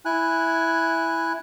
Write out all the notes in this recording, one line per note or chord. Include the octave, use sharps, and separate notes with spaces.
E4 G#5 F#6